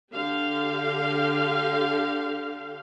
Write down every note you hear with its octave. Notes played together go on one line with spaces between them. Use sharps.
D3 G4 F5